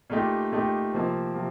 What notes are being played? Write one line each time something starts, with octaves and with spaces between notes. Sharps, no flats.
A#2 A3 D#4 G4
A#2 A3 D#4 G4
C3 F3 A#3 F4
C3 F3